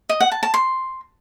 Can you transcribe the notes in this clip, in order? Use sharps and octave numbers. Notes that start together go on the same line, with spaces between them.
D#5
F#5
A5
A5
C6